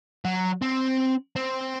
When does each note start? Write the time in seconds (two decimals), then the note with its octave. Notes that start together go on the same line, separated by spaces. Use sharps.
0.25 F#3
0.62 C4
1.36 C4